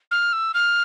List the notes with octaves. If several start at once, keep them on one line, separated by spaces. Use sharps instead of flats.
F6
E6
F6